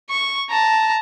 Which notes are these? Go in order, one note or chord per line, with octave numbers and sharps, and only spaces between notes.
C#6
A5 A#5